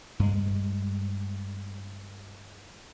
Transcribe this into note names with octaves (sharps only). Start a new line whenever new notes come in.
G2 G#3